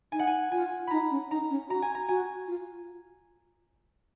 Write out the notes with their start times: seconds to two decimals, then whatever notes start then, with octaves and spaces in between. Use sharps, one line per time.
0.12 D#4 G#5
0.19 F#5
0.27 G#5
0.52 F4 G#5
0.87 D#4 A#5 B5
1.11 C#4
1.31 D#4 A#5
1.50 C#4
1.69 F#4 A#5
1.82 G#5
1.95 A#5
2.09 F#4 G#5
2.48 F4